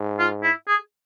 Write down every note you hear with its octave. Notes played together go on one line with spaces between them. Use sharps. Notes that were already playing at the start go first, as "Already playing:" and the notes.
Already playing: G#2
F4
E4
G#4